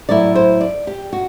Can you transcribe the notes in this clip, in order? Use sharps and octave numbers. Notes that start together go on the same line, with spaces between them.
A2 F#3 B3 E4 D5
C5
D5
G4
F#4